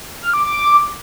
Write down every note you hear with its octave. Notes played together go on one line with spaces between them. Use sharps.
F6
D6
D6